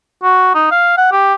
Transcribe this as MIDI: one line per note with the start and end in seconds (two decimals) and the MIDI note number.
0.23 0.53 66
0.54 0.66 63
0.71 0.94 77
0.97 1.09 78
1.12 1.34 67